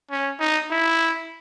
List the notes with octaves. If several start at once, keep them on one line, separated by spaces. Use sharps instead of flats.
C#4
D#4
E4